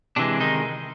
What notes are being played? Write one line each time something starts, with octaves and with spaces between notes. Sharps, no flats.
C3 E3 G#3 D4
D#3 D#4